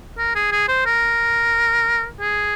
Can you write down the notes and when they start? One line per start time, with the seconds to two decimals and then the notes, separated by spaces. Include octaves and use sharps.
0.18 A#4
0.35 G#4
0.52 G#4
0.68 C5
0.86 A#4
2.20 G#4